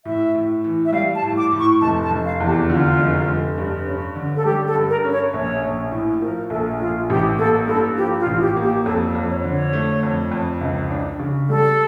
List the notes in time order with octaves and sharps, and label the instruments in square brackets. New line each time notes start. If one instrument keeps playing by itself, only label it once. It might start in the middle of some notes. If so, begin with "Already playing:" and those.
[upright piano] A2 [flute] E5
[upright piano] A2
E3
[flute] E5
[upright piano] G3 [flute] F5
[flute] A5
[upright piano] A2
[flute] D6
[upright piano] A2
[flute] C#6
[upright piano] F1 [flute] A5
[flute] A5
[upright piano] F1
[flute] F5
[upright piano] E2
[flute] G4
[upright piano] D3 [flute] F4
[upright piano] F1
F1
G2
C#4
D3
[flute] A4
[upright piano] G3 [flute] G4
[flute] A4
[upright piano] G2
[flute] A#4
[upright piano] C#4
[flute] C#5
[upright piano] A#1 [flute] C#5
[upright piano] A#1
A2
[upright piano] F3 [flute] A#4
[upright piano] A#1 [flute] A4
[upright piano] A#1 [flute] F4
[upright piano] A1 [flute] G4
[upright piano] A#3 [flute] A4
[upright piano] G2 [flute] A4
[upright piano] F3 [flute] G4
[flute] F4
[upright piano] A1
[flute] G4
[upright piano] A#3
[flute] G4
[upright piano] F2 [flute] A4
[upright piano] F2
[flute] C#5
[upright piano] D3
[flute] C#5
[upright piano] A3
F2
F2
C#2
D4
C#3
[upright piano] G3 [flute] A4